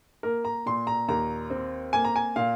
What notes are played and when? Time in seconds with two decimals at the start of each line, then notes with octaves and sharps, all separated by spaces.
0.23 A#3 A#4
0.45 A#5
0.66 A#2 C6
0.87 A#5
1.08 D#2 A#5
1.50 C4
1.93 A#3 G#5
2.04 A#5
2.16 G#5
2.36 A#2 F5